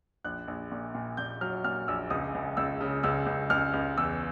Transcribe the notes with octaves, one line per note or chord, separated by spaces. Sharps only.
A#1 F#6
A#1
A#2
A#2
A#2 G6
F#3 F6
A#2 F6
A#1 E6
C#2 D#6
C#2
C#2 E6
C#3
C#2 E6
C#2
C#2 F6
C#2
E2 E6